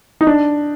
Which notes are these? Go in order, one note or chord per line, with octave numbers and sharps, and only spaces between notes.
D#4
D4